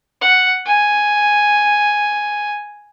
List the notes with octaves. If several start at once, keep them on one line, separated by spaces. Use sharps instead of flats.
F#5
G#5